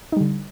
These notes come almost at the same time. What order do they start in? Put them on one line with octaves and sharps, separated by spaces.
D#4 G3 D3